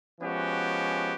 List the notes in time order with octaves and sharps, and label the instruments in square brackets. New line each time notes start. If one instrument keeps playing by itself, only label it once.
[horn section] F3 G#3 B3 C#4 F#4 G4